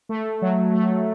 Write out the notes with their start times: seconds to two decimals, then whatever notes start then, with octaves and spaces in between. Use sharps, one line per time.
0.09 A3
0.42 F#3
0.73 A3